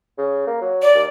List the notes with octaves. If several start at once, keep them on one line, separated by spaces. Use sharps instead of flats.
C#3
A#3
F#3
D5
D#2